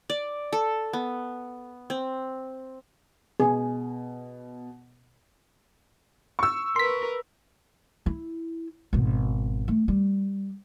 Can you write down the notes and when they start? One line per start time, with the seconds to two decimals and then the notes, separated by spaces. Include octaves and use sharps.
0.10 D5
0.53 A4
0.93 B3
1.90 C4
3.40 B2 G#4
6.39 C#6 E6
6.76 A#4 B4 C6 B6
8.06 E4
8.93 G#1 B2
9.68 A3
9.88 G3